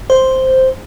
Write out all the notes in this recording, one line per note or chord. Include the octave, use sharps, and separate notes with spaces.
C5